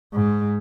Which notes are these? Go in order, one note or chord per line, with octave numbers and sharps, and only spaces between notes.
G#2